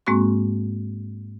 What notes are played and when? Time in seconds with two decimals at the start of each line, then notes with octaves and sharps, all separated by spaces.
0.07 G#2 G#3 A#3 C4 F#4 C#6